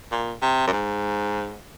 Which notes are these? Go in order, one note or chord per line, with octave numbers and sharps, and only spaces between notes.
A#2
C3
F#2
G#2